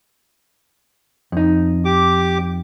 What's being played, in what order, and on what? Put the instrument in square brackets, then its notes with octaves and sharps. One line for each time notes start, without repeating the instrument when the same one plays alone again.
[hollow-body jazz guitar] F2 D#4
[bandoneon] G4 D6